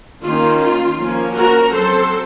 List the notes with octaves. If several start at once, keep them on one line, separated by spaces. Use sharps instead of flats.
D#3 A#3 C#4 F4
F4
F3 A#3 C#4
F#4 A#4
F#3 C4 A4 C5